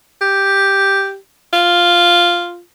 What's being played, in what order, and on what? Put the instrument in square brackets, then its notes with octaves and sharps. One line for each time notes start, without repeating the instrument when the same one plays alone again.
[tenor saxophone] G4
F4